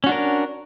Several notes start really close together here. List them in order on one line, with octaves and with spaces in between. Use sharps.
C#4 F#4 D4 A#4